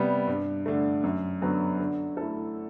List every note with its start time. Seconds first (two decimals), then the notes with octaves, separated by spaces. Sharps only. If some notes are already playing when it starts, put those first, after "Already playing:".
Already playing: C3 G3 B3
0.27 G2
0.66 D3 A3
1.03 F#2
1.42 D3 F#3 B3
1.79 D3
2.17 A3 E4 A4